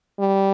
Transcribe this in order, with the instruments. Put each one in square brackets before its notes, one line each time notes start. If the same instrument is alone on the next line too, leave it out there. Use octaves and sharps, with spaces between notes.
[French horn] G3